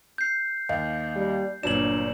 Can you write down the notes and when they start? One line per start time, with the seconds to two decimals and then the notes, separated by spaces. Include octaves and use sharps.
0.18 G6 C7
0.69 D#2 D#5 F5
1.16 G3
1.63 G1 A#2 F#3 D4 D5 E7 F#7